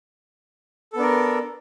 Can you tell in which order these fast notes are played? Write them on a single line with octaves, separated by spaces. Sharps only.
A4 B3 D4 A#4